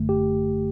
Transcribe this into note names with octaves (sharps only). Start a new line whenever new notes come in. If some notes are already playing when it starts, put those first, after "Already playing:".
Already playing: G1 F#2 D3 A3
G4